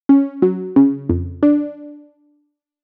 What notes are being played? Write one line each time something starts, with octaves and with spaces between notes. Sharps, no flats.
C#4
F#3
C#3
F2
D4